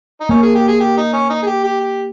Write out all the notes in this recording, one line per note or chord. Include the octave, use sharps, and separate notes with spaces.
D#4
A#3 C#4
G#4
G4
G#4
G4
D#4
C#4
D#4
G#4
G4
G4
G4